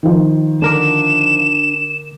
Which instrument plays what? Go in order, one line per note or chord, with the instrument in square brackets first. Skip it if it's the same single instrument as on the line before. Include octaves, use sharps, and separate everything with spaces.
[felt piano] D#3 F3
[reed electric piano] D3 A#4 D6 [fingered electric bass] D4 [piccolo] E7